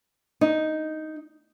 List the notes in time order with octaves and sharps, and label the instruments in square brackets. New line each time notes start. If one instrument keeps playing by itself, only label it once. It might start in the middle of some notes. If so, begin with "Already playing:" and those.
[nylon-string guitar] D#4